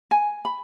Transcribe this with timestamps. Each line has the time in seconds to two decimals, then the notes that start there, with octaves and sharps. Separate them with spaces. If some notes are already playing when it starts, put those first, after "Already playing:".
0.11 G#5
0.45 B5